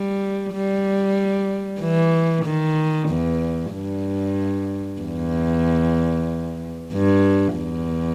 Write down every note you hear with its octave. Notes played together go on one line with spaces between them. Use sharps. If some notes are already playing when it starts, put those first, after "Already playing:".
Already playing: G3
G3
E3
D#3
E2
G2
E2
G2
E2